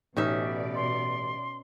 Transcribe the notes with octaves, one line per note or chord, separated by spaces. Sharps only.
A1 B2 C#4 D#4 D5 E5
C6